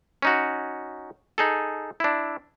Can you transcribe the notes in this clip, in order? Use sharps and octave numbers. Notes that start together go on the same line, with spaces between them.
C#4 D#4 F#4
D#4 G#4 A4
D4 E4